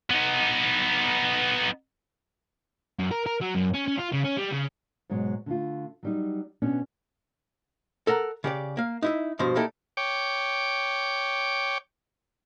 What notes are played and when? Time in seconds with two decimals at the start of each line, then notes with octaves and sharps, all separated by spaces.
0.10 B3 D#4
2.99 F#2
3.11 A#4
3.26 A#4
3.41 F#3
3.55 F#2
3.75 C#4
3.88 C#4
3.99 F4
4.13 C#3
4.25 C#4
4.38 G3
4.52 C#3
5.09 G#2 B2 F#3 G#3
5.46 D3 A3 F4
6.03 F#3 G3 D#4
6.62 B2 B3 C#4 D4
8.07 A4 A#4 F#5 A#5
8.44 C#3 G4 D5
8.77 A#3 F5
9.02 D#4 E4 E5
9.39 G2 B2 F3 C5
9.56 A#3 D#4 E4 G4 A4 D5
9.97 C#5 G5 D6